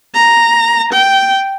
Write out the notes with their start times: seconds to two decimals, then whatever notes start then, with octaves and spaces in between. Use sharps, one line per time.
0.15 A#5
0.93 G5